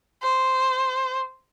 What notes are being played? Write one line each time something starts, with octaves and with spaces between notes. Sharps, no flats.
C5